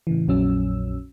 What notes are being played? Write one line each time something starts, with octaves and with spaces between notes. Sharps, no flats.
A2 C#3 E3
A#1 F2 A#2 F#3 C#4 E6